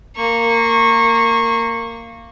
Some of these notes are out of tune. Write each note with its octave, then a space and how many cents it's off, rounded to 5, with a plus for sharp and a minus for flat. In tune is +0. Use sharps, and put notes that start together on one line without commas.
A#3 -15 C#6 -20